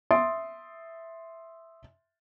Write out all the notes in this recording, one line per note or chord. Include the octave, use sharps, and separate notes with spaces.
E5 C6 D#6 A6 D7